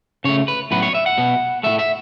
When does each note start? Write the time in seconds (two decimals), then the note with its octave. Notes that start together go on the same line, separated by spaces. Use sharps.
0.24 C#3 A3 C#5
0.48 B4
0.71 A2 F#3 B3 B4
0.83 C#5
0.95 E5
1.06 F#5
1.18 B2 B3
1.63 A2 F#3 A3 E5
1.79 E5